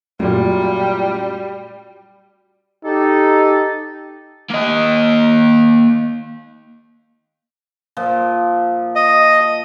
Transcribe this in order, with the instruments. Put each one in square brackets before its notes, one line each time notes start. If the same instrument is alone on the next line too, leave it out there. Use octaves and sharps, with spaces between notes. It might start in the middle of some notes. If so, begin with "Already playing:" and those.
[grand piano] F#2 A#2 [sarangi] G3 [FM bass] A3 [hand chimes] F#4
[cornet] D#4 [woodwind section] G4 A4
[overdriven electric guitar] A#3 D#5
[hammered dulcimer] A#2 F3
[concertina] D#5